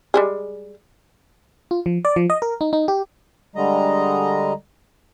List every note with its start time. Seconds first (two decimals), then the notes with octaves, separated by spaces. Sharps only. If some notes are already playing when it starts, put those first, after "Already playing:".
0.14 G3 G#3 G#4
1.71 F4
1.86 F3
2.05 D5
2.16 F3
2.30 D#5
2.42 A#4
2.61 D#4
2.73 D#4
2.88 G4
3.55 D3 G3 G#3 D#5 A#5